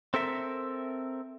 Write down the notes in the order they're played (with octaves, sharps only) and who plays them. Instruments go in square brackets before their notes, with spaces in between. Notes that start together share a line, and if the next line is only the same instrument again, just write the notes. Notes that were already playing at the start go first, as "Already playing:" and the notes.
[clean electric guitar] C4 A4 A#4 E5